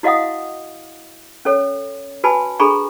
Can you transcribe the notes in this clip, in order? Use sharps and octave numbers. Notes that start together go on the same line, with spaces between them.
E4 F#4 D#5 F5 F#5 D#6
C#4 A4 C#5
F#4 B4 G#5 A5 B5
D4 G#4 A4 A#5 B5 C#6